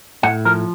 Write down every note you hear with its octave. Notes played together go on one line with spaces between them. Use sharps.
A2 F#5
F3 A#4